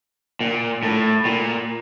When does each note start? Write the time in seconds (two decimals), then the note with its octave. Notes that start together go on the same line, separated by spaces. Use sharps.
0.41 A#2
0.83 A2
1.25 A#2